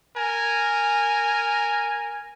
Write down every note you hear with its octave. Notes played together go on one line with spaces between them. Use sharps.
A#4 G#5